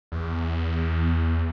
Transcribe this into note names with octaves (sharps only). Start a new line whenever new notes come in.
E2